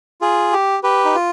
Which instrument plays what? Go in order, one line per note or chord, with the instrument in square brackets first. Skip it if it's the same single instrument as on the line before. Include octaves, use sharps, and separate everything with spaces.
[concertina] F4 G#4
G4
G4 B4
D#4
F4